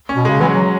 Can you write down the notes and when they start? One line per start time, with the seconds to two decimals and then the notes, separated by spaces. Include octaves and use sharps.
0.09 C#4
0.15 B2
0.25 G#3
0.28 C#3
0.41 E3 F#3
0.56 F#3